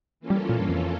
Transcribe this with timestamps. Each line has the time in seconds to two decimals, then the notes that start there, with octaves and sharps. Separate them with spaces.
0.20 E3 A#3 C#4 F4 A4
0.30 G3
0.49 A#2
0.59 G2
0.69 F2